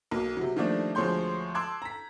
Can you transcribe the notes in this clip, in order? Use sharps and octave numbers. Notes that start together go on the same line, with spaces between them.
B1 A#3
C3 F#3
D#3 F3 G3 A3 A#3 D4
D2 F3 G#3 C#5 C6 G6
A5 C6 D6 E6 F#6 G#6
A#5 B6